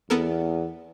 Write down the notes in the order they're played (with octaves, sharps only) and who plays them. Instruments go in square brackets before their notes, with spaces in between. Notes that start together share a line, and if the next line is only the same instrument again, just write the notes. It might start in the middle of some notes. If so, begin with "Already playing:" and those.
[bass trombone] E2 [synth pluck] B3 A4 A#4